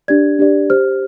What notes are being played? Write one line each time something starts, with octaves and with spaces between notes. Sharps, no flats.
D4 G4 D5 G#6
D4 G4 D5
G4 C5 F6